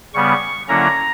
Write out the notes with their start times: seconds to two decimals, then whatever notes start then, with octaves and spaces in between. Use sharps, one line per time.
0.14 C#3 G3 B3 C#6
0.68 D3 F#3 A#3 C#4 E4 A#5